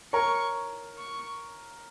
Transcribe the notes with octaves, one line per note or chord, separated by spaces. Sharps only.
A#4 C#5 C#6
C#6